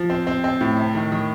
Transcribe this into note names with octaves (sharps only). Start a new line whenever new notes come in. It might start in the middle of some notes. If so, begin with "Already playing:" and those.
Already playing: F3
C4
C4
C4
A2
C3
D#3
D#3